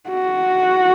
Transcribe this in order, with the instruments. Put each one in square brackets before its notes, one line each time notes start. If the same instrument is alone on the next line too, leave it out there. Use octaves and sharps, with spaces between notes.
[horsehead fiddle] F#4